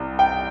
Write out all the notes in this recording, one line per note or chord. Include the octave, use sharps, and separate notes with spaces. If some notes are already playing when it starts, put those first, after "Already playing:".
Already playing: C2
G5